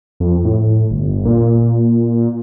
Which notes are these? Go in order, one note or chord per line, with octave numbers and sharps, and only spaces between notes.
F2
A2
G1
A#2